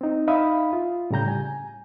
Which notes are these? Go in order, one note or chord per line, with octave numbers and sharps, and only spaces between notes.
C4 D#4
D#4 E5 F5 B5 D#6
F4
A2 C#3 G3 A#5 G6
G#5